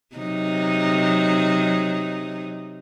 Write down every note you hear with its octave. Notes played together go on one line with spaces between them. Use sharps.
C3 F#3 D#4